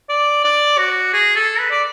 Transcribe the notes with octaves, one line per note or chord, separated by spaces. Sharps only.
D5
D5
F#4
G#4
A4
B4
D5